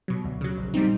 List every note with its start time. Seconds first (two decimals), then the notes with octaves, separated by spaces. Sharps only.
0.08 B2 F#3
0.25 D2
0.41 C#3 F#3
0.57 A#1
0.74 A#2 G3 C4 D#4